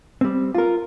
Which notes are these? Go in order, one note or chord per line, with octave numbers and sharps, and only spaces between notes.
G3 C4
F4 A#4